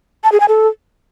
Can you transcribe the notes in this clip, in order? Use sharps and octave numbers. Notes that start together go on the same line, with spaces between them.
A5
G#4
G#5
A4